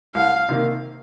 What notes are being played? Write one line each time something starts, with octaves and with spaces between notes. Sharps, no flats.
C2 F5
C3 D#3 A#3